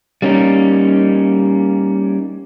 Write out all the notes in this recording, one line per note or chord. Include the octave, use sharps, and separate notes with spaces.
G3 A#3 C#4 D#4